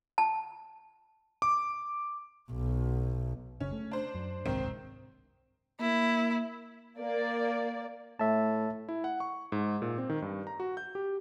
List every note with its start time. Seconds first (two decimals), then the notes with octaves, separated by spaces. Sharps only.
0.18 A5
1.42 D6
2.52 B1
3.60 F#1 C#3 C#4
3.73 A3
3.91 D4 C5
4.15 F#2
4.45 F#1 C2 G#2 D#3 C4
5.80 A#3 E4
6.99 A#3 D5
8.19 A2 E5 A5
8.89 E4
9.04 F#5
9.20 C#6
9.52 G#2
9.82 A#2
9.98 C4
10.10 D#3
10.22 G2
10.47 A#5
10.60 F#4
10.77 G6
10.95 G4